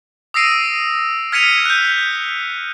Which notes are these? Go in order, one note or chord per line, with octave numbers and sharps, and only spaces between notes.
D#6 E6 A#6 C7 D7 D#7
F6 G#6 B6 C#7 D#7 F7
F#6 G6